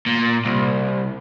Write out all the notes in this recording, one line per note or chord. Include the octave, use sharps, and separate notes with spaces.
A#2
C2